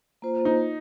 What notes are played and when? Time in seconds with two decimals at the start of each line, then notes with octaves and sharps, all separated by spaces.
0.22 A#3 F4 C5
0.45 D#4